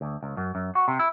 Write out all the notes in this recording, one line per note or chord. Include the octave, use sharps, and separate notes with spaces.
D2
C#2
F#2
F#2
F#4
C3
E4